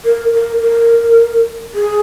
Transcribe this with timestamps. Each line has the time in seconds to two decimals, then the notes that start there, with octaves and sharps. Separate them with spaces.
0.05 A#4
0.33 A#4
0.61 A#4
1.74 G#4